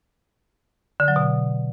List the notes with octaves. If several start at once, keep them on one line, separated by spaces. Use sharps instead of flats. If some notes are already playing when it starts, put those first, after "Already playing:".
D3
F#3
B2